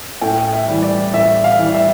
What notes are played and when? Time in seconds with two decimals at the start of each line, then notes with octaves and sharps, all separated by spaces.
0.21 A2 G5
0.53 E5
0.68 E3 G3
0.83 D5
1.14 A2 E5
1.44 F5
1.59 E3 G3
1.75 E5